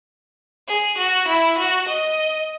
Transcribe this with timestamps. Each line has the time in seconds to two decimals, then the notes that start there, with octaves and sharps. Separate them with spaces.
0.68 G#4
0.98 F#4
1.28 E4
1.58 F#4
1.89 D#5